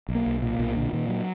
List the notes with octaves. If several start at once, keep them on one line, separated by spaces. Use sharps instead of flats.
B1
A#3
B1
A#2
B1 A#3
A#2 D3
A#2 D#3
F#3